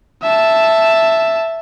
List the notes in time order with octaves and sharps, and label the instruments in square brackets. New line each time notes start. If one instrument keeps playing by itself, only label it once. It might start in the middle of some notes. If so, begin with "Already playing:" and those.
[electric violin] E5 A5